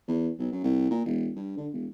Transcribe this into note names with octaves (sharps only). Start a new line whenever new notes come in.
E2
B1
F#2
C2
A#2
E1
G2
D3
E1